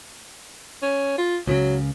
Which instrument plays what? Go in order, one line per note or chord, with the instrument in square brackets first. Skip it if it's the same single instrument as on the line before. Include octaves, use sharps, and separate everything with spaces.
[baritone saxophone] C#4
F4
[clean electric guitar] C#2 A2 C#3 [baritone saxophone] F#3